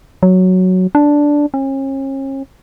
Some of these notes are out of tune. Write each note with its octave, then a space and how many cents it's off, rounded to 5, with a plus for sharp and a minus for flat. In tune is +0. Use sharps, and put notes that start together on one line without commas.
F#3 +0
D4 -5
C#4 -40